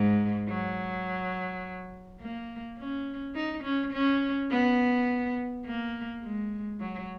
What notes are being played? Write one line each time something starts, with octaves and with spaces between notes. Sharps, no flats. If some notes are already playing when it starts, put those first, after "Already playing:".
Already playing: G#2
F#3
A#3
C#4
D#4
C#4
C#4
B3
A#3
G#3
F#3